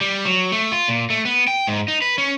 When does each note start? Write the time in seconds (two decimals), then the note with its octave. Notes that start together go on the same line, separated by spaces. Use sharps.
0.01 G3
0.25 F#3
0.52 A3
0.72 F4
0.88 A#2
1.10 A3
1.25 B3
1.48 G5
1.67 G#2
1.88 D#4
2.02 B4
2.18 C#4